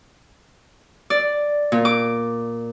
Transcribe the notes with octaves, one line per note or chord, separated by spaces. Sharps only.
D5
A#2
D6